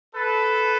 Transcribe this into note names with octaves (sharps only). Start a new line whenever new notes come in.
A4 B4